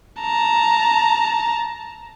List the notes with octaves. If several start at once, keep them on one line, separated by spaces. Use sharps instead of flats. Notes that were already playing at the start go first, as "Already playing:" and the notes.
A5 A#5